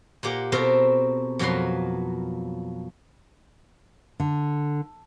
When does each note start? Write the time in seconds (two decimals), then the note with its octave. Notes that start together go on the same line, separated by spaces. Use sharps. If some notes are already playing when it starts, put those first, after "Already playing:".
0.23 A#2 A#3 G4 F#5
0.52 B2 C4 G4 A4 A#4 C6
1.39 F2 B2 F#3 A#3 B4 C6
4.20 D3